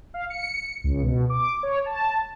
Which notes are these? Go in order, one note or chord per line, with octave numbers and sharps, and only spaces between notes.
F5
C#7
C#2
B2
D6
C#5
A5